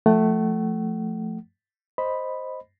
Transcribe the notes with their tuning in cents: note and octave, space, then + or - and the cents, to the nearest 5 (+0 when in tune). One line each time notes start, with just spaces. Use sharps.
F3 +0 A3 +0 F#5 +40
C5 +0 D#5 +0 B5 +0